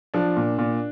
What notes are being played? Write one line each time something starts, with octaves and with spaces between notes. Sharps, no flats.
F3 D4
A#2
A#2